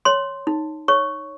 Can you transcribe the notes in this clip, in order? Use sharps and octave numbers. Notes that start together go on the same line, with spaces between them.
C#5 C6
D#4
C#5 C#6